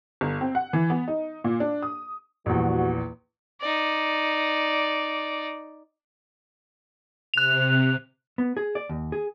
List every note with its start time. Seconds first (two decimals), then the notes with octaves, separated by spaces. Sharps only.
0.21 G1
0.41 C4
0.55 F#5
0.73 E3
0.90 B3
1.08 D#4
1.44 A#2
1.60 D4
1.82 D#6
2.46 A#1 E2 G3 B3 F#4
3.61 D#4 D5
7.34 C3 F#6 F7
8.38 B3
8.57 G#4
8.75 D5
8.89 D#2
9.12 G#4